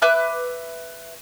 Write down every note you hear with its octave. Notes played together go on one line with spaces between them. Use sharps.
B4 E5 D6 F#6